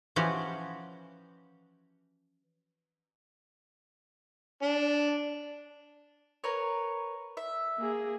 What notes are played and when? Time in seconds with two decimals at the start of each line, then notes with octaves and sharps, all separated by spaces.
0.16 E3 F3 C#4 F#4 G4
4.62 D4
6.44 A#4 B4 C#5
7.37 E5
7.78 A#3 G#4